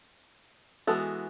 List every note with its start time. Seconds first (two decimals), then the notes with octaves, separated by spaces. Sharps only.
0.87 E3 G#3 B3 F#4 A4